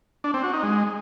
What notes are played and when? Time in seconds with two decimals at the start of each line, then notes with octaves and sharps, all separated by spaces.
0.24 D4
0.34 C4
0.44 F#4
0.53 D#4
0.63 G#3